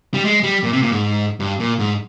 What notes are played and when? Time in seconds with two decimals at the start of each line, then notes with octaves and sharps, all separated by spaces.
0.14 G3
0.25 G#3
0.43 G3
0.63 A#2
0.73 C3
0.83 A#2
0.92 G#2
1.40 G2
1.60 A#2
1.79 G#2